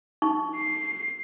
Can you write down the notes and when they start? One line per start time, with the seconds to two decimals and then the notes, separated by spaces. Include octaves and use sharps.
0.22 D#4 C#6
0.56 C7